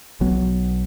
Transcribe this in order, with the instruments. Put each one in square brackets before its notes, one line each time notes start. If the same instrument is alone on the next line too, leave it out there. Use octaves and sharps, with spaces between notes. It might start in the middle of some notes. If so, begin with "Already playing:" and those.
[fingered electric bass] B1 F#3 B3